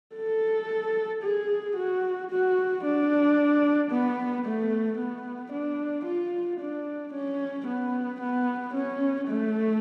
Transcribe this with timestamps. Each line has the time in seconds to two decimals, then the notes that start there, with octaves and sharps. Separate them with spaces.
0.15 A4
1.23 G#4
1.76 F#4
2.30 F#4
2.84 D4
3.90 B3
4.45 A3
4.99 B3
5.52 D4
6.05 F4
6.60 D4
7.13 C#4
7.67 B3
8.21 B3
8.73 C#4
9.28 A3